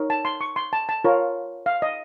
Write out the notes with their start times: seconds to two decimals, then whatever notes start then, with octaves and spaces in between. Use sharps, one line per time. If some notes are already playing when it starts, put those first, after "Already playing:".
Already playing: D#4 A#4 C#5
0.10 A5
0.25 C6
0.41 C#6
0.56 C6
0.73 A5
0.89 A5
1.04 F4 A#4 C#5
1.66 F5
1.82 D#5